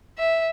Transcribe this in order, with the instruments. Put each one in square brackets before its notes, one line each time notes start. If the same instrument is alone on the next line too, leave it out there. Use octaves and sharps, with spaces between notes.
[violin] E5